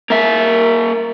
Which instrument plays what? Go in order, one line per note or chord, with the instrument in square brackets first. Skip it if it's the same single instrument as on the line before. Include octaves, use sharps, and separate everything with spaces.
[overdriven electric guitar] A#3 E5